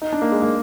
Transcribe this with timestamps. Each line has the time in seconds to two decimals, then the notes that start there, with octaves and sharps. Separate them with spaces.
0.02 D#4
0.13 D4
0.22 A#3
0.32 G#3
0.42 A#3